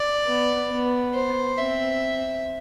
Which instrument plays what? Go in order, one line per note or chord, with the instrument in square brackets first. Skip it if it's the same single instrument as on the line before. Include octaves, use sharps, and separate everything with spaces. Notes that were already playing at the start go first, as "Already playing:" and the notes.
Already playing: [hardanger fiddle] D5
[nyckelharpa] B3
B3
[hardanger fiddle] C5
[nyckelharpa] C4 [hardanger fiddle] E5